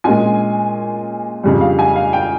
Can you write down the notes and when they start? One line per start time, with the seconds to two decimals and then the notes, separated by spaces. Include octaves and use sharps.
0.04 A#2 G#3 C#4 F4 G#5
1.43 F2 C#3 G3
1.61 F5
1.79 G#5
1.96 F5
2.13 G5